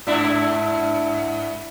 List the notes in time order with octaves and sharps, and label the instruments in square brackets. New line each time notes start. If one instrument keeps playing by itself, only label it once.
[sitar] G#2 D4 E4